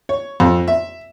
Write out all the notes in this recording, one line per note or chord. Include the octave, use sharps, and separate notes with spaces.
C#5
F2
E5